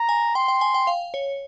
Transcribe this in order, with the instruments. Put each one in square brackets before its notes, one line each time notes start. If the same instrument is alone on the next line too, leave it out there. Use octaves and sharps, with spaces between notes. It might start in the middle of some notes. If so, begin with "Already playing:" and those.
Already playing: [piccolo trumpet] A#5
[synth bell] G#5
[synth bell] G5 [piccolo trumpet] C6
[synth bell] G5
G#5
G5
F5
C#5